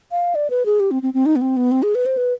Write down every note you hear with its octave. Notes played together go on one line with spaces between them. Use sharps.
F5
D5
B4
G#4
G4
C4
C4
C4
D#4
B3
C4
B3
C4
G#4
B4
C5
B4